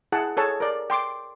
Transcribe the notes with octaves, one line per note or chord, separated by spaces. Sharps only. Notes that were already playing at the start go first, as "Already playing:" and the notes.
E4 G#4 F#5 A5
G#4 A4 C#5 A5
A#4 D5
G5 C6 D6